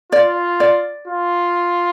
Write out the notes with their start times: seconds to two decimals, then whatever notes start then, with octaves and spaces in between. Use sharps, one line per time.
0.12 F4 D5
0.60 D5
1.07 F4